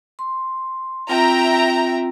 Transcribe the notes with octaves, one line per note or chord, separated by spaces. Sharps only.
C6
C4 F4 E5 G5 A#5